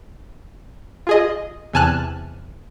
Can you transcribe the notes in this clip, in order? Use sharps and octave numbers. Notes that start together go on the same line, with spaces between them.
F4 G#4 D#5
E2 C3 G#5 A5 F6 F#6